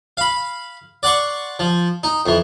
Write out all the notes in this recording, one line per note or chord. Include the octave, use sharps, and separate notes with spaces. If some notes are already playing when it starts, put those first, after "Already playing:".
F5 B5
D5 F#5 C6 C#6
F3
D#4
F2 E3